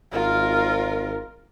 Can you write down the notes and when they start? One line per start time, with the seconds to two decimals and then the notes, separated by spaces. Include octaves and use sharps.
0.12 G#1 F4 A#4